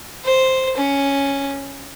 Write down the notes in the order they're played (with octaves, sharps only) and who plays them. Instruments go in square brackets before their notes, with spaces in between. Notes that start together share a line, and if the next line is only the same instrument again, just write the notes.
[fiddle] C5
C#4